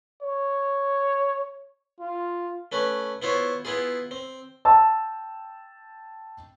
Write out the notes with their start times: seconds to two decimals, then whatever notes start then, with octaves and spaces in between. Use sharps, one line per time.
0.22 C#5
2.00 F4
2.72 A3 C#4 B4
3.22 B3 E4 F4 C5 C#5
3.65 B3 E4 F4 G#4
4.11 C4
4.65 G5 A5 E6